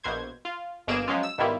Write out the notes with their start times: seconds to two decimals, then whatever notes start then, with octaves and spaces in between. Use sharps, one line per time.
0.04 A#1 B2 C5 G#6
0.45 F4
0.87 G1 B2 A#3 G#4 D7 E7
1.08 F3 F#3 G#3 C#4 F4
1.23 E6
1.38 G#2 B2 D#3 G3 E4 F4